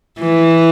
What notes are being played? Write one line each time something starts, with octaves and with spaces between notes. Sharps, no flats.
E3